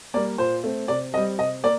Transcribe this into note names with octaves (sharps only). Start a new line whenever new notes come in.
G3 A#3 D5
A#2 C5
A3 C4
C3 D5
G3 C4 D#5
C3 D#5
A#3 D5